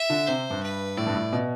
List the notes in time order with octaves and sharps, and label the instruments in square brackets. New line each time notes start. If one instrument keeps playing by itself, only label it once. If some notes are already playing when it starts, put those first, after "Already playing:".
Already playing: [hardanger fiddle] E5
[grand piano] D3
[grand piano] C3 [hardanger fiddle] C5
[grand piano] G2
[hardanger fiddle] B4
[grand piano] A2 [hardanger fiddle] D5
[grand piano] G2
A2
B2